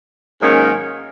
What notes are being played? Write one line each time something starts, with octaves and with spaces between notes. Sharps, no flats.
G#2 D#3 F#3 A#3 C#4